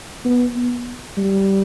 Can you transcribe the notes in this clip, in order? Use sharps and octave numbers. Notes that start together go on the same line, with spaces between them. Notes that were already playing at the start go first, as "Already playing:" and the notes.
B3
B3
G3